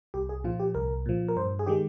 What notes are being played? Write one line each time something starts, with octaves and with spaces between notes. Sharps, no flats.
C2 G4
G#4
A#2 F3 F4
G4
C2 A#4
A#2 F3
A#4
G2 C5
G#4
D#3 G#3 G4